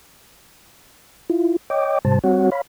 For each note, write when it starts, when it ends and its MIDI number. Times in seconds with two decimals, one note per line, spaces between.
1.30 1.56 64
1.30 1.56 65
1.70 1.99 73
1.70 1.99 75
1.70 1.99 79
1.70 1.99 86
2.05 2.19 44
2.05 2.19 48
2.05 2.19 55
2.05 2.19 72
2.05 2.19 81
2.24 2.50 55
2.24 2.50 60
2.24 2.50 66
2.24 2.50 73
2.24 2.50 78
2.52 2.61 73
2.52 2.61 77
2.52 2.61 83